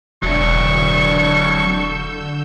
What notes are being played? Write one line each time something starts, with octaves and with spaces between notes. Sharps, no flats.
E1 D3 F#3 D4 C#6 E6 G6